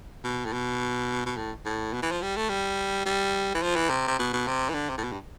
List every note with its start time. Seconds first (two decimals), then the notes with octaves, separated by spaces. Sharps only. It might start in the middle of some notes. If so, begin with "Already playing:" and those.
0.24 B2
0.46 A2
0.53 B2
1.26 B2
1.37 A2
1.65 A2
1.93 B2
2.02 E3
2.12 F3
2.22 G3
2.36 A3
2.49 G3
3.06 G3
3.54 E3
3.62 F3
3.76 E3
3.90 C3
4.08 C3
4.19 B2
4.33 B2
4.47 C3
4.70 E3
4.74 D3
4.89 C3
4.98 A2
5.04 B2
5.12 G2